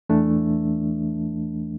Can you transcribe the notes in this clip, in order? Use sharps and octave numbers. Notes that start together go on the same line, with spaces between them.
E2 E3 A3 D4